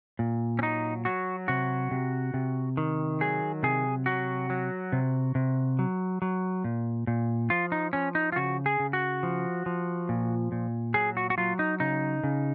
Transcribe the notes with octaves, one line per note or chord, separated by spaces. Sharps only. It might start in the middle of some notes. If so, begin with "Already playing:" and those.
A#2
C#4
F#3 D#4
F#3 F#4
C3 F#4
C3
C3
D#3
F#3 G#4
C3 G#4
F#3 F#4
F#3
C3
C3
F#3
F#3
A#2
A#2
F3 F4
D#4
F3 C#4
D#4
F4
C#3 F#4
G#4
C#3
F#4
F3
F3
A#2
A#2
F#3 G#4
F#4
F#4
F#3 F4
D#4
C#3 D#4
C#3